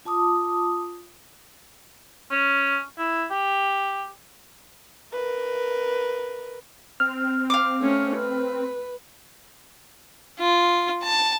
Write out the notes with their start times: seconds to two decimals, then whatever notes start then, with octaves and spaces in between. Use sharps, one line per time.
0.05 F4 A5 D6 D#6
2.31 C#4
2.98 E4
3.31 G4
5.13 A#4 B4
7.00 C4 F6
7.50 F5 D6
7.80 A3 C#4
8.17 B4
10.40 F4
11.03 A5